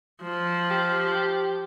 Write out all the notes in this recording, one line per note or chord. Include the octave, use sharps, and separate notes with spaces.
F3
G4